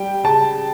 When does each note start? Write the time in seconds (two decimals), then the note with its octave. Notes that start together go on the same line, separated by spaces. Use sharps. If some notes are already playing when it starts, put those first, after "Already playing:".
Already playing: G3 G5
0.24 C#3 A5